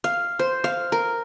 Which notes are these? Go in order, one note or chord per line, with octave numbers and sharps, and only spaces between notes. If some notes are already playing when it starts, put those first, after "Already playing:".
F5
C5
F5
A#4